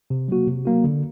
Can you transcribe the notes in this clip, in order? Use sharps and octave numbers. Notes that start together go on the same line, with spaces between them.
C3
F#3 A#3 F#4
C3
F#3 A#3 F#4
D3